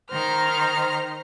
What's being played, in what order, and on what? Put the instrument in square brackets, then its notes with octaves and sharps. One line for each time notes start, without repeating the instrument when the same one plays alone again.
[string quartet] D#3 A#5 F6 [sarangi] C5